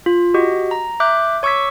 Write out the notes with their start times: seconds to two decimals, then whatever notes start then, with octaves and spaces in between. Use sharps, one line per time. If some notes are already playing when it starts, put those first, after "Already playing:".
0.06 F4
0.34 F#4 G4 D#5
0.71 A#5
1.00 E5 D6 F#6 G6
1.43 C#5 C#6 D6 E6 G#6 B6